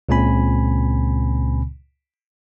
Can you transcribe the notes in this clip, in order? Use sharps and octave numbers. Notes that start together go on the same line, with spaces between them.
C#2 A#2 C#3 C4 G#5 B5